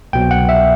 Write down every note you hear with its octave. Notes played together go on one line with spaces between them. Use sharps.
C2 B2 F#3 G5
F#5
E5